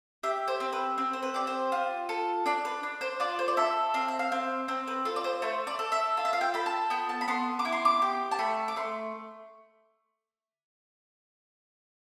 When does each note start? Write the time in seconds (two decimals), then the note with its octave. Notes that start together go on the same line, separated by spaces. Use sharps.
0.23 G4 E5
0.48 C5
0.60 C4
0.72 B4
0.98 C4
1.13 C5
1.23 B4
1.34 G4 D5
1.47 C5
1.72 F4
2.09 A4
2.46 D4 D5
2.65 B4
2.83 D4
3.01 C5
3.20 F4 D5
3.39 C5
3.48 D5
3.57 A4 E5
3.94 C4 F5
4.08 E5
4.19 F5
4.32 C4
4.68 C4 C5
4.87 B4
5.05 F4 A4
5.16 D5
5.24 C5
5.42 A3 C5
5.67 D5
5.79 A4
5.92 E5
6.17 F4
6.25 E5
6.33 F5
6.41 G5
6.54 A4 B5
6.66 A5
6.90 B3 G5
7.09 A5
7.21 B5
7.28 B3 C6
7.59 D6
7.65 E4
7.72 C6
7.85 D6
8.02 G4
8.31 A5
8.39 A3 B5
8.68 D6
8.76 A3 C6